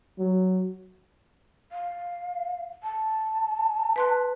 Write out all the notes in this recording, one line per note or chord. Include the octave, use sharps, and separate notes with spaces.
F#3
F5
A5
B4 C6 F#6